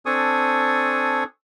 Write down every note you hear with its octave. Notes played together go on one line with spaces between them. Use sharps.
C4 D4 A4 G#5 C#6 D#6